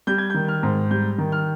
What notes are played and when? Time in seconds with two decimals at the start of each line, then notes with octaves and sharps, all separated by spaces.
0.07 G3 G6
0.18 G#6
0.30 D#3 G6
0.48 F6
0.63 G#2
0.90 G3 G6
1.18 D#3
1.32 F6